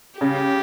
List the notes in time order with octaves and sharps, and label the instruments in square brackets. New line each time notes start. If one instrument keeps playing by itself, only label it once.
[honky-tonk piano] C#3 [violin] G4